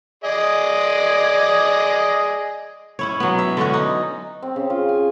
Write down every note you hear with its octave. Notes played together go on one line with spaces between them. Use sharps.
G#4 D5 D#5
C#4 E4 C#5
F#3 B3
E5
D3 C#4 F#4
D#4
C4
C#3
F4
G#5